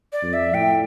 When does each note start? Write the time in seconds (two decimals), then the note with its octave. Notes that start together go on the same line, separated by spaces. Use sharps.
0.13 D5
0.23 F2
0.33 E5
0.54 A2 G5